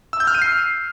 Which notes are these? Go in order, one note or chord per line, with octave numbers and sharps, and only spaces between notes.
E6
G6
F6
D#7
C7